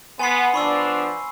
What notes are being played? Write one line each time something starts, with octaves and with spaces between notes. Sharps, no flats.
B3 G#5 C6 C7
F3 B3 D4 B5 C#6 E6